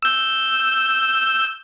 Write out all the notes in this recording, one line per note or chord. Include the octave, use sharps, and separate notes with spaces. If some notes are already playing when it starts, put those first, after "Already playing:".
E6 G6